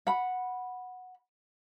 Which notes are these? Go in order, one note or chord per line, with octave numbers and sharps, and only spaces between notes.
F#5 B5